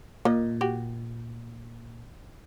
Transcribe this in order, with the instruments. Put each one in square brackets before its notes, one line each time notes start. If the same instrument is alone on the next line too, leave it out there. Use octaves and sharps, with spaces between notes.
[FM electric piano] A#2 [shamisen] A#3 D#5
[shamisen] F#4 G4